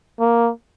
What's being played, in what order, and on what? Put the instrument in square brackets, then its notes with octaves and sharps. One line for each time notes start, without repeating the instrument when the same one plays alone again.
[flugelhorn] A#3